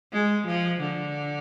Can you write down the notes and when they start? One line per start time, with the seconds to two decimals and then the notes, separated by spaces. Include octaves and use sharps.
0.13 G#3
0.47 F3
0.81 D3